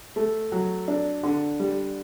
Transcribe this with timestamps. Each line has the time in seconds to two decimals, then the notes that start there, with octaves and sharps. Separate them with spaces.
0.16 A3
0.52 F#3
0.88 D4
1.23 D3
1.60 G3